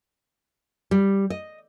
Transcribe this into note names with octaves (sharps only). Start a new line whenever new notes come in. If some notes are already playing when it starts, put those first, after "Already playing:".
G3
D#5